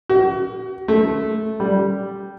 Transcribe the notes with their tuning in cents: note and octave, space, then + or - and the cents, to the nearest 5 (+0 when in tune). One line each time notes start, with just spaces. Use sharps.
F#4 +35
A3 -15
G3 +0